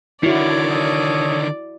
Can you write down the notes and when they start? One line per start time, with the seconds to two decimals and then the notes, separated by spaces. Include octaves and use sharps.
0.23 D3 D#3 E4 F#4 C#5 D5
0.69 A4 C#5 D#5